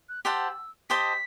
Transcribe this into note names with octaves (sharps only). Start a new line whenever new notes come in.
F#6
G4 C5 F#5 A5 E6
G4 C5 D#5 A5 B6